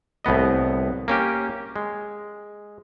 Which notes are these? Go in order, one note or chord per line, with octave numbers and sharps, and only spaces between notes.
C2 A2 B3 D#5
A#3 C#4 G4
G#3